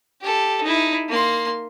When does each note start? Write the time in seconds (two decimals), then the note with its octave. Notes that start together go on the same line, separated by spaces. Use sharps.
0.21 G4 A4
0.63 D#4 E4
1.10 A#3 C6